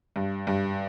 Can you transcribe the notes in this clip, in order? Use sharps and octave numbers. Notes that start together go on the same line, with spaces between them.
G2
G2